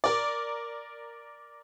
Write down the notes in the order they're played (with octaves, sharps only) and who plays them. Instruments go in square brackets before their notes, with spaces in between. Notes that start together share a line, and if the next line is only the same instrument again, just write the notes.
[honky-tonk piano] A#4 D5